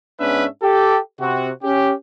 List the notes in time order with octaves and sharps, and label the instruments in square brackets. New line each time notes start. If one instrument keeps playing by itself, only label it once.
[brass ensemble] G#2 B3 C#4 D4 B4 E5
G4 A4
C3 C4 F#4
C#4 G4